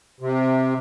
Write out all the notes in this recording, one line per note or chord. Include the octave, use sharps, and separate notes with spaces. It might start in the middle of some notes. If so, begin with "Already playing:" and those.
C3